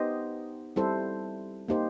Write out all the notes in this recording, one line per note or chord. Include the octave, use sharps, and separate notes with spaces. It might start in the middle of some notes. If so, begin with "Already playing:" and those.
Already playing: B3 D#4 G4 C5 D#5
G3 C4 E4 A4 C5
A#3 D#4 G4 C5